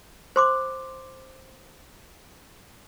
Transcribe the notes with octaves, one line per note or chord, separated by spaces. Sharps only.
C5 C6 D6